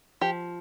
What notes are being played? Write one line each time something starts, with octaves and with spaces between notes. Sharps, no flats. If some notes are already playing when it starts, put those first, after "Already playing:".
F3 G4